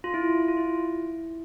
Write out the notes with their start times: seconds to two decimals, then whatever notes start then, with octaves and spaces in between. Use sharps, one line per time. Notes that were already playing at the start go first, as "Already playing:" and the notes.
0.04 F4
0.14 E4
0.48 F4
0.57 E4